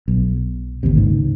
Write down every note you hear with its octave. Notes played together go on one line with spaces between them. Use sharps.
B1
G#1 D#2 C3
C#2 G#2